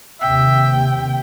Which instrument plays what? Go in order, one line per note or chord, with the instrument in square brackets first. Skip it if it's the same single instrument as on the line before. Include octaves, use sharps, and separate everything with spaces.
[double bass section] D#2 C3 [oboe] E5 [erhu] G5